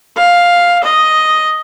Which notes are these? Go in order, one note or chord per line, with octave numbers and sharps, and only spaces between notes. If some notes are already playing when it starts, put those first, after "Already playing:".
F5
D#5